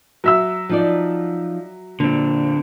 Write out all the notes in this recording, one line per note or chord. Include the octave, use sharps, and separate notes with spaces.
F#3 E5 E6
F3 D#4 D5
A#2 D3 C4